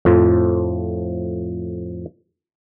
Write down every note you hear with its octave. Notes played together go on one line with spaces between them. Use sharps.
F2 A2 F3